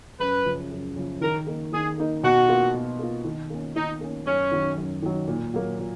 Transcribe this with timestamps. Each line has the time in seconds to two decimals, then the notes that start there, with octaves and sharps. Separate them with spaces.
0.20 F#2 B4
0.45 C#3 F3
0.71 F#2
0.96 C#3 F3
1.21 D#3 A#4
1.46 A#3 D#4 A#4
1.72 D#3 G#4
1.98 A#3 D#4 A#4
2.23 B2 F#4
2.48 A#3 F4
2.74 B2
2.99 A#3 F4
3.25 D#3
3.50 A#3 C#4
3.75 D#3 D#4
4.01 A#3 C#4
4.26 F#2 C#4
4.52 D#3 F#3
4.77 F#2
5.02 D#3 F#3
5.28 A#2
5.54 F#3 A#3
5.79 A#2